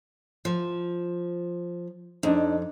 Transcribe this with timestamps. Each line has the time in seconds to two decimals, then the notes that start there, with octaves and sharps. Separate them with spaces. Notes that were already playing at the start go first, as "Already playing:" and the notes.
0.45 F3
2.23 F2 D4 D#4